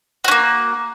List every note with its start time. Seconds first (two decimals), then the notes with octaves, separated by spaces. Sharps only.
0.24 F#4
0.28 C#4
0.31 A#3